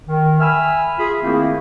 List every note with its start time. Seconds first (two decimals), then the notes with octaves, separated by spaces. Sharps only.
0.08 D#3
0.40 E5 G#5 B5 E6 F6
0.98 F4 G#4 E5 B5
1.23 D#3 A3 A#3 C4 E4 G#4